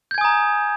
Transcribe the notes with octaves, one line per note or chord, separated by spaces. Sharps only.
G#5 A#5 D#6 G6 G#6